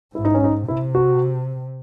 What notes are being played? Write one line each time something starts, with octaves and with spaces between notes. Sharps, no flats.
G#2 E4
D#4
C#4
D#4
C3 E4
F#4